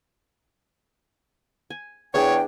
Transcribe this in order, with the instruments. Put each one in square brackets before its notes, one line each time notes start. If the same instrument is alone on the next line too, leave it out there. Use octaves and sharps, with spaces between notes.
[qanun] G#5
[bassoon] E2 [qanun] D4 G#4 [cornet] C#5 [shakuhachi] G5